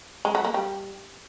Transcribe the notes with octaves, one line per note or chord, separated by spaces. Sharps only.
G#3
F#3
A#3
G3